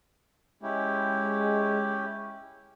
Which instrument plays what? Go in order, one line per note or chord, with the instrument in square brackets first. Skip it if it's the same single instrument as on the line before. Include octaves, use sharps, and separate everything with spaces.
[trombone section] G#3 [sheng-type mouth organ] C#4 E4 G4